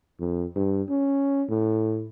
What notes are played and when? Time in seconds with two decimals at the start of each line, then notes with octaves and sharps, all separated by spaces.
0.20 F2
0.56 G2
0.90 C#4
1.50 A2